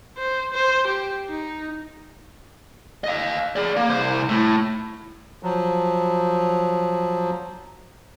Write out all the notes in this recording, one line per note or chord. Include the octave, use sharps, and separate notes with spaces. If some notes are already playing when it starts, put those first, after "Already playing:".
C5
C5
G4
D#4
D#5 F5
G#4 D5
A#3
C2 C5
A2
F3 F#3